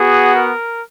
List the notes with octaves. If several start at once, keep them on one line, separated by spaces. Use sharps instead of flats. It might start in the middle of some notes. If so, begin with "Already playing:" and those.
Already playing: B3 F#4 G#4
A#4